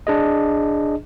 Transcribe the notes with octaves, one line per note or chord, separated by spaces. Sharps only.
D4 G#4 D#5